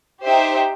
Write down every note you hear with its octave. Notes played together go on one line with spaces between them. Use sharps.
D#4 G4 C5 E5 G5